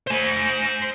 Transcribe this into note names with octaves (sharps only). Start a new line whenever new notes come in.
C5 G#5